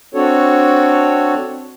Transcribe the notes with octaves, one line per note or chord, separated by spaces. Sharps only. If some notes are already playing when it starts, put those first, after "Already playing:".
C4 D4 F#4 A4 C#5